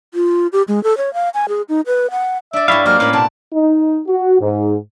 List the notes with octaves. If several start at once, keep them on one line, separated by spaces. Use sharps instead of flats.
F4
G4
G#3
A4
C#5
F5
G#5
G#4
D#4
B4
F#5
D4 D5 E5
G2 G3 E4 C#5 E5 F5
F#3 G#3 A#3 C5 F6
A2 C#4 A#4 F5 B5
B2 C4 A5
D#4
F#4
G#2